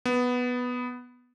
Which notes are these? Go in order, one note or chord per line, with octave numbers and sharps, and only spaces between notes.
B3